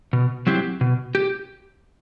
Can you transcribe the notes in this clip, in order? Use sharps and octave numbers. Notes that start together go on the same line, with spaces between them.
B2
F#3 C4 E4 G4
B2
G4